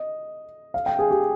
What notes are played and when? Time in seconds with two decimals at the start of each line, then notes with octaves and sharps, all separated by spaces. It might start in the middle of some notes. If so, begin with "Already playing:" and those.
Already playing: D#5
0.74 F5
0.86 G5
0.99 G#4
1.11 G4